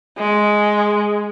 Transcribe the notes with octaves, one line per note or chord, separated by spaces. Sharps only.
G#3